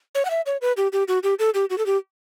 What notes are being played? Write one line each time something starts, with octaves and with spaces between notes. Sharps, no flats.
C#5
F#5
E5
C#5
B4
G4
G4
F#4
G4
A4
G4
F#4
A4
G4